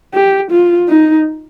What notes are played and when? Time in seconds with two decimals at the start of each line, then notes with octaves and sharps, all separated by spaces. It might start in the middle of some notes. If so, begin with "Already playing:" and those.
0.14 G4
0.51 F4
0.89 D#4